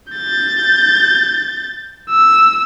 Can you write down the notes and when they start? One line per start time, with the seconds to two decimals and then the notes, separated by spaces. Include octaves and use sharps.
0.13 G6 A6
2.10 E6